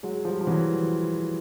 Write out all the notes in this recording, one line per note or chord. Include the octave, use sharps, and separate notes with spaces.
F#3 G#3
F3 G3
F3
E3 F#3